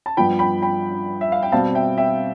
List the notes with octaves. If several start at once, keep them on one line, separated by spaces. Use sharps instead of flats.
A5
G2 F3 B3 G5 B5
G5 B5
G5 B5
E5
F5
G5
B2 G3 C4 F5 A5
E5 G5
E5 G5